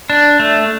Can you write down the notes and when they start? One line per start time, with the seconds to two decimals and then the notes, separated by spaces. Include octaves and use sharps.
0.10 D4
0.39 A3